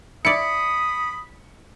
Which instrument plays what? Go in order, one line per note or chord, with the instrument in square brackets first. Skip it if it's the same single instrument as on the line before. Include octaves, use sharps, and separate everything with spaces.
[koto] E4 D5 [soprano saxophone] B5 [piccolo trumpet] D#6 [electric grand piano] C#7